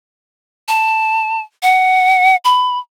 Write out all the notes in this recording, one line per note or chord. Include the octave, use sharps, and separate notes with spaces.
A5
F#5
B5